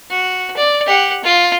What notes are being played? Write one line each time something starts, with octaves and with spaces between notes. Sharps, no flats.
F#4
D5
G4 F#5
F4